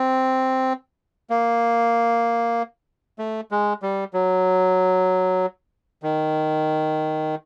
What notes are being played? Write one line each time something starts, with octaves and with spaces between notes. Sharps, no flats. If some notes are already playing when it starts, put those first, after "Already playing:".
Already playing: C4
A#3
A3
G#3
G3
F#3
D#3